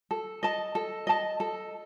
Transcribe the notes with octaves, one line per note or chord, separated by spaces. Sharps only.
A4
D#5 A5
A4
D#5 A5
A4